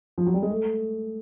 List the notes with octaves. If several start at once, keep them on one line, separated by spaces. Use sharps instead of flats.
F3
F#3
G3
G#3
A3